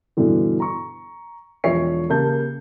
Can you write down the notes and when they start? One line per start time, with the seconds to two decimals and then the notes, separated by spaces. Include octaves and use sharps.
0.17 G2 B2 D3 E3
0.60 A#5 C#6
1.64 E1 F3 C#5 E5 C7
2.10 C#3 A#3 G4 A5 G6